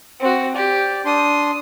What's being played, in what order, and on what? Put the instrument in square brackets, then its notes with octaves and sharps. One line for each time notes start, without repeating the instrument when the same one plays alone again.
[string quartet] C4 F#4
[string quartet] G4 [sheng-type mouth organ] D5
[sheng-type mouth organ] D4 C6 [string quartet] D#6